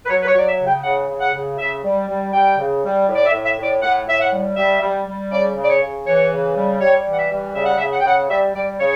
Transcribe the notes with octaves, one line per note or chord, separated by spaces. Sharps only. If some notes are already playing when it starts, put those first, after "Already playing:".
B4
F#3 C#5
B4
C#5
F#3 D5
E5
C#3
G5
C#3 F#5
C#3
F#5
C#3
C#3 E5
G3
G3
G3 G5
C#3
G3
A2
D5
E5
A2
E5
A2
D5
A2 F#5
A2 E5
F#5
G3
G3 E5
G3
G3
C#3 D5
C#3
D5
C#5
C#3
E3 C#5
C#3
G3
G3 C#5
E3
F#5
E5
G3
C#3 E5
F#5
C#3 E5
F#5
G5
C#3 F#5
G3 E5
G3 D5
C#3 C#5